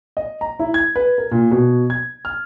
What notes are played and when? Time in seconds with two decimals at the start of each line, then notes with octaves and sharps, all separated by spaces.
0.17 D#5
0.41 A#5
0.59 E4
0.74 G#6
0.96 B4
1.18 A#4
1.31 A#2
1.51 B2
1.90 G#6
2.25 F6